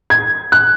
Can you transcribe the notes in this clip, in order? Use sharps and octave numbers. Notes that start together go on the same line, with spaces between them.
G#6
F#6